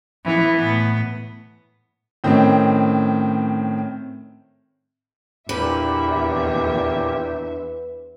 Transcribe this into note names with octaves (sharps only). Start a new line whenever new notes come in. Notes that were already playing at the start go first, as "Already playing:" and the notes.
E3 B3
A2 B3
A2 D#3 C4 C#4
E2 A#2 D4 G4 B4 E5